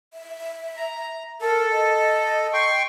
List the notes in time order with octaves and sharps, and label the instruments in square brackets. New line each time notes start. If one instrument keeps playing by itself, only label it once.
[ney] E5
[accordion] A#5
[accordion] A4 [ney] A#4
[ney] D#5
[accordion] G5 C6 C#6